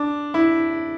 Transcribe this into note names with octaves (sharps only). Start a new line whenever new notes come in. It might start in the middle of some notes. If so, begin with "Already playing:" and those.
Already playing: D4
E4